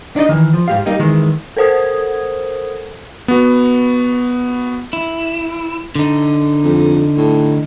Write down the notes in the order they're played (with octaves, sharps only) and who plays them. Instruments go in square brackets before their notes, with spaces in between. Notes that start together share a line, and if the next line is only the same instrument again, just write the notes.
[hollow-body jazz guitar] D4 D#4 D5 D#5
D#3 E3
F3
G#2 G4 F5
G3 A#3 D#4 G4
D#3 E3 G#3
[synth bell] A4 A#4 C5 F#5 D#6 G#6
[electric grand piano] B3 F#4
[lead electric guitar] E4
D3 D#4
[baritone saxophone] F2
A2